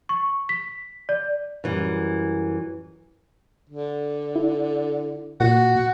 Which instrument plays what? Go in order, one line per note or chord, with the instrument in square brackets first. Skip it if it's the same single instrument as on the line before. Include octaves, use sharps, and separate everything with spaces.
[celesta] C#6
B6
D5
[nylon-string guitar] F#2 E3 G3
[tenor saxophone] D3
[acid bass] E4
[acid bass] A#2 [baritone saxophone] F#4